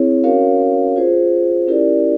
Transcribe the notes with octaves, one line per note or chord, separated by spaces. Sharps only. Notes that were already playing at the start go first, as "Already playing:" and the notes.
Already playing: C4 E4 G#4 C#5
C#4 F#4 A#4 C#5 F5
F4 G#4 C5
C#4 E4 G4 A#4 D5